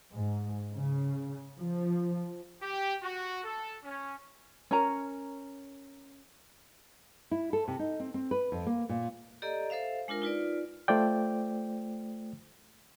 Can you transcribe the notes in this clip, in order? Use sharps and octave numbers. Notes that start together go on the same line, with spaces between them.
G#2
C#3
F3
G4
F#4
A4
C#4
C#4 A#4 A#5
E4
A4
C3
D#4
C4
C4
B4
F2
A#3
A#2
G4 A4 D5 D#5 A#5
A4 C5 E5 F5
G#3 D4 F4 A#4
D#4 F4 B4 D5
A3 F4 C5 D5 G5